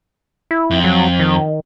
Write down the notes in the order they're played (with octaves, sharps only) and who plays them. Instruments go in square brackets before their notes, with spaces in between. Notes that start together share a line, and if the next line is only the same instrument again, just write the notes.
[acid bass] E4
[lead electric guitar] F2
[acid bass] F#3
D#3